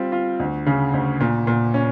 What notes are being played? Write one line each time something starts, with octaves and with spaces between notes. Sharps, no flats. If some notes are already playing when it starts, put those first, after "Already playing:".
Already playing: G3 C4 F4
F4
D2
C#3
D2
A#2
A#2
C#4